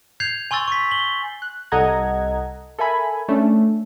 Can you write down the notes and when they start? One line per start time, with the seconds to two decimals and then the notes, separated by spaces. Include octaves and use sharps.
0.20 G6 G#6 C7 F7
0.51 G#5 C6 C#6 E6 A6
0.68 C#6 B6
0.91 F#7 G7
1.42 F#6
1.72 C2 A4 D#5 F#5 A#5 G#6
2.79 A4 A#4 E5 G#5 B5 G#6
3.28 A3 C#4 D4